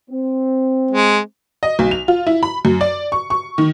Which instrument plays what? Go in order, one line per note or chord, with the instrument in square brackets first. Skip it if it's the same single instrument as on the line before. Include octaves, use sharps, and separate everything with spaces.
[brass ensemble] C4
[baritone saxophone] G#3
[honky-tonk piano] D#5
B1
F7
F4
E4
B5
F#2
D5
C#6
C#6
D#3